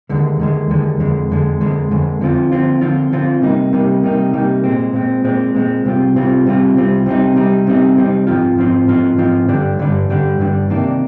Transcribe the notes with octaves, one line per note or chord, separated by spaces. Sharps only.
D#2 D3 G#3
D#2 D3 G#3
D#2 D3 G#3
F2 D3 G#3
F2 D3 G#3
F2 D3 G#3
F2 D3 G#3
D3 F3 C4 F4
D3 F3 C4 F4
D3 F3 C4 F4
D3 F3 C4 F4
C3 G3 A#3 D#4
C3 G3 A#3 D#4
C3 G3 A#3 D#4
C3 G3 A#3 D#4
A#2 G#3 C4
A#2 G#3 C4
A#2 G#3 C4
A#2 G#3 C4
C2 C3 G3 C4 F4
C2 C3 G3 C4 F4
C2 C3 G3 C4 F4
C2 C3 G3 C4 F4
C3 G3 C4 D#4
C3 G3 C4 D#4
C3 G3 C4 D#4
C3 G3 C4 D#4
G#2 F3 C4 F4
G#2 F3 C4 F4
G#2 F3 C4 F4
G#2 F3 C4 F4
G2 D3 G3 D4
G2 D3 G3 D4
G2 D3 G3 D4
G2 D3 G3 D4
C3 D#3 A#3 D4